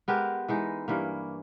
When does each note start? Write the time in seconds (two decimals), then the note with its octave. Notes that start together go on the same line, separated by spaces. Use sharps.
0.08 G#3 B3 G4 A#4
0.48 E3 G#3 D#4
0.88 G2 E3 A#3